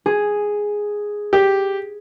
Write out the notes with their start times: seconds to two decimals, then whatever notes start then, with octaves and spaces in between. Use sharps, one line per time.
0.06 G#4
1.33 G4